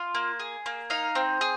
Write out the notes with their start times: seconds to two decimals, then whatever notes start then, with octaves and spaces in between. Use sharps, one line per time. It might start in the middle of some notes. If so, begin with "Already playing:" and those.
Already playing: F4
0.15 A#3
0.40 G#4
0.66 A#3
0.90 D#4 F5
1.15 C4
1.41 G#4